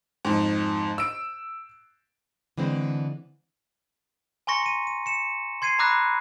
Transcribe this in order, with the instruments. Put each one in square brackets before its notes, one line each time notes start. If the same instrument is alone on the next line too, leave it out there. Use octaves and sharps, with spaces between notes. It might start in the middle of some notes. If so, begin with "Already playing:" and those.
[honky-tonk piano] F2 G#2
E6 D7
[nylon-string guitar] D3 E3 G#3 C4
[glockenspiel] G#5 A#5 C6 C#6 A#6 C#7
C#6 D#7
D#7
C#7 E7
C6 G#6 C7 D#7
A#5 B5 D6 E6 F#6 A#6